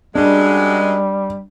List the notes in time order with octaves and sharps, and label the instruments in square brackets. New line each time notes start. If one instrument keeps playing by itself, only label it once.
[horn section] F#2 G#3 [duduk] G3 [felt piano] D4